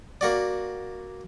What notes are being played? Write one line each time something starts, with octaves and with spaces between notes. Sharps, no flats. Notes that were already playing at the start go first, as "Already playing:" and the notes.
A#3 F#4 D5